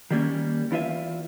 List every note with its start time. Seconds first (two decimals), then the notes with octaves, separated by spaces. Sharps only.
0.11 D#3 G3 A#3 C#4
0.71 E2 E4 F4 B4 E5